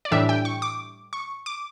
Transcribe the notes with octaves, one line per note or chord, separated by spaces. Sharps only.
D5
A2 E3 G3 D4 E5
G5
C#6
D6
C#6
D6